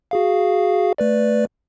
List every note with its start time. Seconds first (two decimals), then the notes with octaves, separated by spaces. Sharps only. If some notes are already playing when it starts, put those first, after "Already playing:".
0.11 F#4 G#4 F5
0.98 A3 B4 D5